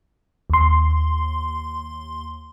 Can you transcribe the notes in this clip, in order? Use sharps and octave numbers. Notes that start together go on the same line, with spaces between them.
D#2 C6